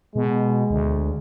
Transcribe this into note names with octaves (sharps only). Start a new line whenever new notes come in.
B2 G#3
D2